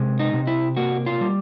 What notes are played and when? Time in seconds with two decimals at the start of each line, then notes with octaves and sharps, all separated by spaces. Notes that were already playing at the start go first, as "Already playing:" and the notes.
Already playing: C3 G#3
0.20 D#4
0.33 C3
0.47 E4
0.77 A#3 F#4
1.06 F4
1.21 G3